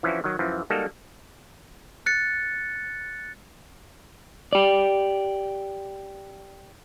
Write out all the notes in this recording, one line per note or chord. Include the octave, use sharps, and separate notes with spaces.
E3 F3 C#4 D4 E4 F#4
D#3 F#3
F#2 E3 F3
G3 G#3 A#3 D#4 F#4 A4
F#6 A6 C#7
G4 D5